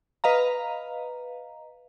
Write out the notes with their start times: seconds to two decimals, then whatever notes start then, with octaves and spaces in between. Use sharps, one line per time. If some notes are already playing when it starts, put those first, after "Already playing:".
0.24 B4 D#5 F5 A#5